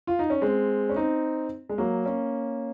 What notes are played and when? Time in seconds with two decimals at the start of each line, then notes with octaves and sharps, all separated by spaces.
0.07 F4
0.19 D#4
0.30 C#4
0.41 G#3 C4
0.89 C#4
0.96 C4 D#4
1.69 G#3
1.78 F#3 A#3
2.05 A#3 C#4